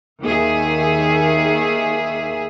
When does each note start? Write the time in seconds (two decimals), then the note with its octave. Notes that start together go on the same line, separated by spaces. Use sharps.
0.23 D#2 D#3 G#4 E5